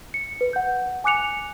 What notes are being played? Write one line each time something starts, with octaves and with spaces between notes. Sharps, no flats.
C#7
B4
F#5 G6
G#5 D6 F#6 C#7 F7